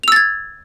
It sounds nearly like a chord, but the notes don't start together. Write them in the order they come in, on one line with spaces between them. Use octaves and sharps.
F7 E6 A6 G#6